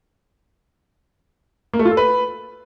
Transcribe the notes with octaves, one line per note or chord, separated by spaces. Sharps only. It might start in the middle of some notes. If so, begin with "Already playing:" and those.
A#3
A3
F4
A4
B4